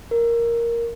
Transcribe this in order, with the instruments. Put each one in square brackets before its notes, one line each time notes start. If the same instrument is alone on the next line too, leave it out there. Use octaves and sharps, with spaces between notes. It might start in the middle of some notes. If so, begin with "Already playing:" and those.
[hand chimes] A#4